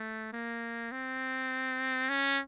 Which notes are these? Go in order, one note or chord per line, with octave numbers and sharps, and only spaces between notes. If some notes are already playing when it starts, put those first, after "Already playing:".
Already playing: A3
A#3
C4
C#4